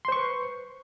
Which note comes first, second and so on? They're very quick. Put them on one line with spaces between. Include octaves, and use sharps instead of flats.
C6 C5 C#6 B4